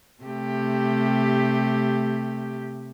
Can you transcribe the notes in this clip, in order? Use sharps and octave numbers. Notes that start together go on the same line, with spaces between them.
C3 A3 G4